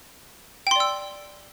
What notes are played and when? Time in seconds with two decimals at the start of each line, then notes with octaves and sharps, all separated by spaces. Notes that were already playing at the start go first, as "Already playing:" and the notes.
0.67 G5
0.71 C6
0.76 D5
0.80 E6